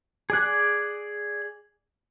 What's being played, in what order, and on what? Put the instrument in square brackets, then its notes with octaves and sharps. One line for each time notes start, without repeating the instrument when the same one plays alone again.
[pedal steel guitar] G#4 D5 F#6